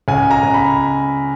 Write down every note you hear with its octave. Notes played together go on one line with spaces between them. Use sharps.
C#2 G#5
A#5
C#2
B5